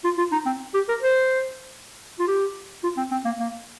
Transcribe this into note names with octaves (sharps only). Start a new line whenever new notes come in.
F4
F4
D#4
C4
G4
A#4
C5
F4
G4
F4
C4
C4
A#3
A#3